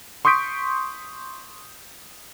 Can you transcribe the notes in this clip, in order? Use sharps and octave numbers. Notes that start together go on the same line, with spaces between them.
C6 C#6 D#6 G6 B6 D7